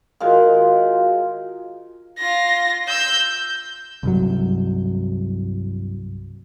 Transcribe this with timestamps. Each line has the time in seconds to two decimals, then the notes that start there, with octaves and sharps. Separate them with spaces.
0.21 D#3 G#3 F4 F#4 F5
2.19 F4 A#6
2.88 E6 G6
4.03 C2 G2 F#3